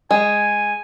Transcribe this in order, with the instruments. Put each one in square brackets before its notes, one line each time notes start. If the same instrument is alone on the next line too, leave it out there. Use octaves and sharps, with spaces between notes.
[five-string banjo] G#3 [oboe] G#5